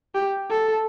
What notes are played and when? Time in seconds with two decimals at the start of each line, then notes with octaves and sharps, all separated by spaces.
0.15 G4
0.50 A4